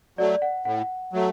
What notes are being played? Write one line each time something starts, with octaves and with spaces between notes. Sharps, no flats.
F#3 A3 D5
F#5
A2 F#5
F#3 A3